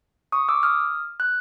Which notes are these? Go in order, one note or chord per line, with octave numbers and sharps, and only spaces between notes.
C#6 D#6
D6 E6
D#6 F6
F#6